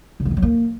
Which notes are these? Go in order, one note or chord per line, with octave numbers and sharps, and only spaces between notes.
C#3
G3
D#3
F#3
A#3